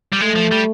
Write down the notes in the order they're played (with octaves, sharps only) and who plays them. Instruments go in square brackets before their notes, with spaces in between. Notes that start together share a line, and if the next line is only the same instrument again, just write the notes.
[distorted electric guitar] G3
[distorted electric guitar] G#3 [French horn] A3
[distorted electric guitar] F3
G3